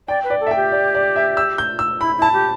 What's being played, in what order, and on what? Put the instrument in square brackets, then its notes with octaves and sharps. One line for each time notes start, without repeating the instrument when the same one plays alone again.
[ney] D5 [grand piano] G5
[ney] B4
[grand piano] D5
[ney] A4
[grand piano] E5
G5
[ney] G4
[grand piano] D5
D5
E5
E6
G6
E6
[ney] E4 [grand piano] B5
[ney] E4 [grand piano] A5
[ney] G4